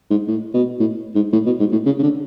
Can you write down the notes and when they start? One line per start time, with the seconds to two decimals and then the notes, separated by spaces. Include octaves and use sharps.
0.10 G#2
0.28 A2
0.54 B2
0.80 A2
1.15 G#2
1.33 A2
1.46 B2
1.60 G#2
1.72 A2
1.86 C#3
1.98 C#3
2.03 D3